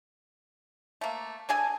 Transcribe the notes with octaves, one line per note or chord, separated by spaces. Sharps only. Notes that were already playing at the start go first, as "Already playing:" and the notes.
A3 A#3
D4 G#4 A4 G#5